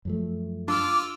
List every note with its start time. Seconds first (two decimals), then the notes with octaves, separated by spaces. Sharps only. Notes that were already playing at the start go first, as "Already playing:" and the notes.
0.05 F#2 F3 A3
0.68 D4 F4 D6 E6 F6